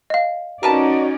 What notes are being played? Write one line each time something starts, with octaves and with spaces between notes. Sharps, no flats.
D#5 F5
C#4 D#4 F#4 A#4 B4 D5 A5